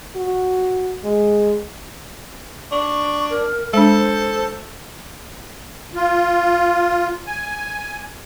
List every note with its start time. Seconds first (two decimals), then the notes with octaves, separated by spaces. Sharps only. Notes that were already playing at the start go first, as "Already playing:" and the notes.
0.16 F#4
1.04 G#3
2.72 D4 C#6
3.30 A#4
3.73 G#3 D4 A4 C5
5.95 F4
7.27 G#5